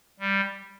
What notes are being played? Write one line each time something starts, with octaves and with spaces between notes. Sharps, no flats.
G3